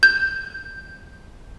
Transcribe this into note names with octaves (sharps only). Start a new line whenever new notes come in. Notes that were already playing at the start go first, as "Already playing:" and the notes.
G6